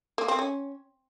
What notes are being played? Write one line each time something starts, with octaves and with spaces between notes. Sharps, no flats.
A#3
C4
C#4